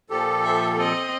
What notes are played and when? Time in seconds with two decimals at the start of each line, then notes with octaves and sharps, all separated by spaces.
0.10 A#2 F3 G4 A4
0.43 C5 E5
0.77 C4 D#5